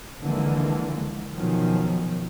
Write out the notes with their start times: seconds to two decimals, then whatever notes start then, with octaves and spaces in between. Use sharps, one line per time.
0.21 C#2 D3 E3 F3 G#3 A#3
1.34 B2 D#3 F3 F#3 C#4